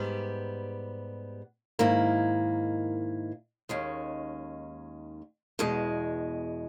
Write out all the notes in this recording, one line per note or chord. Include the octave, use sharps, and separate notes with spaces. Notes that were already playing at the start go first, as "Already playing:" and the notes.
Already playing: G#2 G3 B3 G4
G#2 D#3 A#3 E4
D#2 D#3 G#3 C#4
E2 B2 G#3